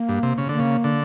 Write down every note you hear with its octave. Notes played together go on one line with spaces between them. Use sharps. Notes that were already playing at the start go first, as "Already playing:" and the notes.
Already playing: A#3
G2
C3
C#3
D3 A#3
C#3
D3